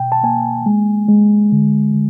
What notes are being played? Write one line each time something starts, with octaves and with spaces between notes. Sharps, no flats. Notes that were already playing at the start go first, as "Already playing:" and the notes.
Already playing: B2 G5
A5
A#3 G#5
G#3
G#3
D3
D3